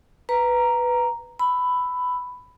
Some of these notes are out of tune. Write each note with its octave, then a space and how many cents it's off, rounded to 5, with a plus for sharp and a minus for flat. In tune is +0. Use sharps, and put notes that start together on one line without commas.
B4 +0 A#5 +0
B5 +10 E6 +0